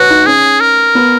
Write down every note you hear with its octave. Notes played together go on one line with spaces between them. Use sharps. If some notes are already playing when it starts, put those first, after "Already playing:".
Already playing: F#4 B4 C#5
D#4
C#4 G#4
A#4
B3